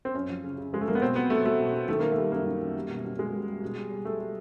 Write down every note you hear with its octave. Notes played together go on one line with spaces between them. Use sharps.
C4
F#2 C#4
F3
C#3
C#3
F3 G#3
A3
F3 A#3
B3
B2 C4
B2 B3
F#3 A3
F#3 A3
B2
B2
D#3 A3
D#3 A#3
A3
G3
F#2 A#3
D#3
F#2
G3
B2
B2
B2 G#3
G3
G3
B2
G3
G3
G3 A3
G3